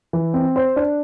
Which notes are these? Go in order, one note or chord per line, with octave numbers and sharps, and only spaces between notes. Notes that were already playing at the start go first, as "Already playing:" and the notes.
E3
C4
C5
D4